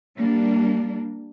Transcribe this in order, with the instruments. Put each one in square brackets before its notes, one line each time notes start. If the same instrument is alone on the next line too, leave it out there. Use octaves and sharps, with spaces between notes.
[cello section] G3 A#3 D4